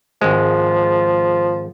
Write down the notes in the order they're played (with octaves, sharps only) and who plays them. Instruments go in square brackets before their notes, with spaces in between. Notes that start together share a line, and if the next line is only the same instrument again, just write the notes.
[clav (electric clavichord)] G#1 G#3 [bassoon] F3